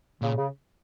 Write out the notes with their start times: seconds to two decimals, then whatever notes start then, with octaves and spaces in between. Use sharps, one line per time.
0.22 A#2 C#3
0.36 C#3